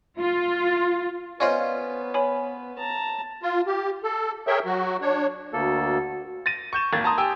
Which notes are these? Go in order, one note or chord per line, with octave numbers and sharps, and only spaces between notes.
F4
B3 C#4 F4 B4 C5 D5 D#5 F5
C#5 G#5 B5
A5 A#5
F4
G4
A4
G#4 A#4 C#5 E5 G5
F#3 F#4
D4 C#5
D2 A#3 F#4 A4
A6 A#6 D#7
C#6 G6 E7
G#1 A#3 G#6 A6
A5 A#5 C6 D#6
G4 G5 G#5 E6